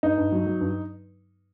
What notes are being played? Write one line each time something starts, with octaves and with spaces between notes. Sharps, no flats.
G2 D#4
G2
F#3
F#3
G2